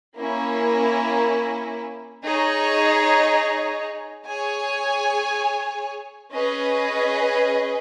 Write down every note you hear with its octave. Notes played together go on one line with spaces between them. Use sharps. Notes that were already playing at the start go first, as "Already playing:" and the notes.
A#3 C#4 E4
D#4 G#4 C#5
G#4 C#5 G#5
C#4 G#4 B4 D#5